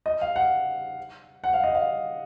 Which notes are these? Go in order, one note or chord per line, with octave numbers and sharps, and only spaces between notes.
D#5
F5
F#5
F#5
F5
D#5
F5